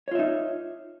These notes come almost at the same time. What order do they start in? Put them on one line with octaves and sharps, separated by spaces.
C#5 F4 E5 D#4